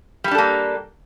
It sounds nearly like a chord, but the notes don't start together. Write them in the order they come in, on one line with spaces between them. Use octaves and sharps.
G3 G4 D4 A4 A#3